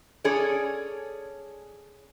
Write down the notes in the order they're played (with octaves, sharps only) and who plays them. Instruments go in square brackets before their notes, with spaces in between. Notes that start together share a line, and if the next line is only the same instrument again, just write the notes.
[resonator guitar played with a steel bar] C#4 G#4 A4 C#5 D5